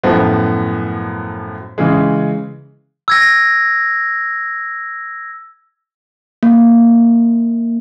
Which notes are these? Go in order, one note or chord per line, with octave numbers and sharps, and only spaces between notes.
F#2 A2 F3 B3
C#3 E3 G#3
E6 G#6 A#6
A#3